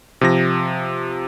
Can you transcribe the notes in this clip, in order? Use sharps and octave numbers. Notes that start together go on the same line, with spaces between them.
C3 F3 A#6